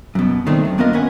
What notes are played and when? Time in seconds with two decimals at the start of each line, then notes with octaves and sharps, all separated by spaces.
0.15 F#2 B2
0.47 D#3 A3 C4 D4
0.65 F#2
0.78 A#3 B3 D4 F4 A#4 D#5
0.93 C#4 B4 F#5 G#5